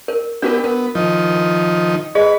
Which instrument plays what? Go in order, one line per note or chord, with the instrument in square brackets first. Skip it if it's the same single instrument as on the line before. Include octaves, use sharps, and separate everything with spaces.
[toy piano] A#4
[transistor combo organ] B3 G4 [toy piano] D4 F#4 A#4
[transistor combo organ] B3 [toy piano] A#4
[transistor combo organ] D#3 F3 D#4
[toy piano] G#4 D#5 [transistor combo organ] B4